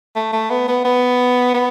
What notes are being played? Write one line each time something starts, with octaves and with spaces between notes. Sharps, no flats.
A3
A3
B3
B3
B3
B3